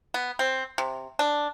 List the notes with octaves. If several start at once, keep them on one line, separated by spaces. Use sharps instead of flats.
B3
C4
C3
D4